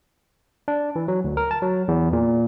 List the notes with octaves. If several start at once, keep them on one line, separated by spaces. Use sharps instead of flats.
D4
E3
F#3
D2
A#4
A5
F#3
E2
A#2